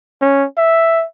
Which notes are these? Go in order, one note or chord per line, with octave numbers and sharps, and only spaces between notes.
C#4
E5